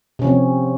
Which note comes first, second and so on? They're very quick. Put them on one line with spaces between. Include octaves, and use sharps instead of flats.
C3 C#4 F3 C4